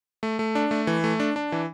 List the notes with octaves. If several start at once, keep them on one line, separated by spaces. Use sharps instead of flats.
A3
A3
D4
A3
E3
A3
D4
D4
E3